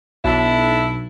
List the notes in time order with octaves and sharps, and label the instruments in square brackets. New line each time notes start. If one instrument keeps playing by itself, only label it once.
[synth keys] B1 [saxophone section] D4 E4